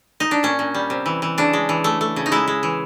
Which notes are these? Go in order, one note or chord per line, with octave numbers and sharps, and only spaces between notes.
D#4
D4
A#2 C#4
A#2
G3
C3
E3
E3
C#3 D4
G#3
E3
A3
A3
C#3
D#4
G#3 E4
G#3
E3